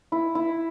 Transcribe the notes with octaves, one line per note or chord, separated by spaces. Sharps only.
E4
E4